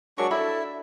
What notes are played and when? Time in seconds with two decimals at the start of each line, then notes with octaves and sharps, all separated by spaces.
0.18 F#3 G#3 D4 A#4 C#6
0.31 D4 E4 F#4 A4 E5 B5